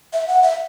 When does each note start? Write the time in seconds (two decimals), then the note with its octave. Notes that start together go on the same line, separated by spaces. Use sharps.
0.13 E5
0.28 F#5
0.43 E5